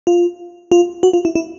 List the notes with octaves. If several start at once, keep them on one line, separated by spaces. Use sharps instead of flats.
F4
F4
F#4
F4
E4
E4